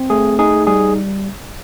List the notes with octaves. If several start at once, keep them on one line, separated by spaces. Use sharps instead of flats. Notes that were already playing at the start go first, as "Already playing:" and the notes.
Already playing: C4
A3 G#4
D#4 G#4
G3 G#4